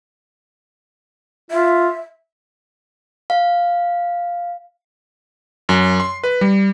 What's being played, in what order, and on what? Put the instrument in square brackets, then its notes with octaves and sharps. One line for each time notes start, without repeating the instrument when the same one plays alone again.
[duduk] F4 [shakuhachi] E5
[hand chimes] F5
[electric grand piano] F#2
C6
B4
G3